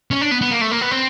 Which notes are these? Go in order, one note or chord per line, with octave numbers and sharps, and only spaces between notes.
C#4
D4
B3
B3
A#3
A3
A#3
B3
C4